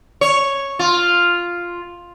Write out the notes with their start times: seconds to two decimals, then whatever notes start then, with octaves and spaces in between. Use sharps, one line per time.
0.21 C#5
0.79 F4